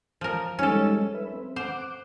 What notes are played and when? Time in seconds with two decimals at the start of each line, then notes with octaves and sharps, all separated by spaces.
0.21 F3 A#4
0.59 G3 G#3 C#4 D#4 A4
1.14 B4 E5
1.33 C4
1.56 C5 F#5 D6